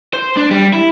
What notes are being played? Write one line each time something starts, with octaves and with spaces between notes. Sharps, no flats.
C5
D4
G3
E4